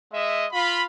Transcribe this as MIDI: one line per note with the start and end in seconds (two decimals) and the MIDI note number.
0.12 0.45 56
0.12 0.45 75
0.12 0.45 76
0.52 0.84 65
0.52 0.84 83